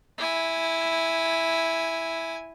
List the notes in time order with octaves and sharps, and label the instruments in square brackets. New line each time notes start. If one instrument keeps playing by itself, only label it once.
[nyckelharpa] E4 G#5